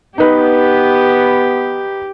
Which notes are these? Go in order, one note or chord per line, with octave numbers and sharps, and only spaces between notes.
B3 D#4 G4 B4